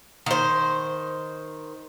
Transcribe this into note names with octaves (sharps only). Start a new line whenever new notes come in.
D#3 C5